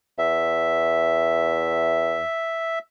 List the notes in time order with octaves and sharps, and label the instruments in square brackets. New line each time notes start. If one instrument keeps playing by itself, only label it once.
[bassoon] E2 [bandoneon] E5